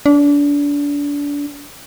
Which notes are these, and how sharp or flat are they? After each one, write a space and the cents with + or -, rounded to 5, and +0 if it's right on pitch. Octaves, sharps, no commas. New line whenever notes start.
D4 -30